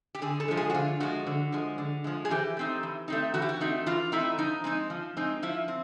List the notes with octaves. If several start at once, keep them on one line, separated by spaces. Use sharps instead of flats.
G4
D3 G#4
A4
F3 G#3
G#4
F#4
D3 F4
F3 G#3 F#4
D3
F3 G#3
D3
F3 G#3
G#4
E3 G4
A3 C4 D#4
E3
A3 C4 D#4
E3 F#4
G4
F#4
A3 C4 D#4
E3 F4
A3 C4 D#4 E4
F3 D#4
G#3 C4 D#4
F3
G#3 C4 D#4
F3 E4
C4